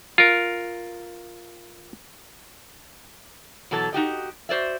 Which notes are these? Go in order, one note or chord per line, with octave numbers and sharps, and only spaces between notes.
F4 A#4
B2 E3 F#3 A4 A5
D#4 F#4 G4 D#5
F#4 C5 D5 E5